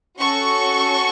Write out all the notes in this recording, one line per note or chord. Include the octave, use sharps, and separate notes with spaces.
C#4 F#4 A4 C#6